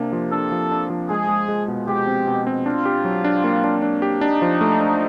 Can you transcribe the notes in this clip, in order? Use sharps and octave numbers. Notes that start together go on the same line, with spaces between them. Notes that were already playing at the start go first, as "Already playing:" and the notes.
Already playing: C3 A#3 D4
F3
D4 A4
F3
D4
F3
G#3 G#4
G#3
G#3
B2
G#3 G4
C4
B2
C4
D4 F4
G4
F#3
D4
A#3
D4
D4
G4
D4 D#4
F3
A3
D4